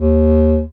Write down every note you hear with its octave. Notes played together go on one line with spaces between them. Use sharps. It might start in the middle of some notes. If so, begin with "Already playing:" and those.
D#2